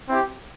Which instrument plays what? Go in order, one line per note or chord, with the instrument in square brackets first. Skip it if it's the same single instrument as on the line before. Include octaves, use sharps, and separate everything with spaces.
[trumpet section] C4 E4 G4